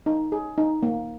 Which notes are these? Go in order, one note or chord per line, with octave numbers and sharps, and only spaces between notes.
D#4
G#4
D#4
A#3